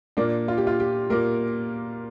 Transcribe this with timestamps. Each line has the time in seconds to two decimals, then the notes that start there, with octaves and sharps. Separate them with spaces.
0.17 A#2 A#3 D4
0.48 F4
0.58 G4
0.67 F4
0.80 G4
1.10 A#2 A#3 A#4